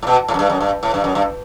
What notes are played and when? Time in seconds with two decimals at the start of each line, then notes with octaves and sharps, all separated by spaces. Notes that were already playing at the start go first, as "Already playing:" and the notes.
0.02 A2
0.07 B2
0.28 A2
0.34 F#2
0.39 G2
0.50 F#2
0.60 G2
0.83 A2
0.94 G2
1.04 F#2
1.15 G2